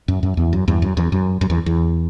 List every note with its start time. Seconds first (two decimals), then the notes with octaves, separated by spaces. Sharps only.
0.08 F#2
0.23 F#2
0.37 E2
0.53 F#2
0.68 E2 G2
0.82 F#2
0.97 E2
1.12 F#2
1.41 F#2
1.50 E2
1.66 E2